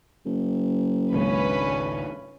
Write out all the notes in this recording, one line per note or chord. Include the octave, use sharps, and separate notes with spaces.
F#1
G#1 C#2 G#3 C#4 B4